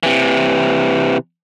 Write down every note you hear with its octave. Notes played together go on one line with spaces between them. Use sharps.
C3 E3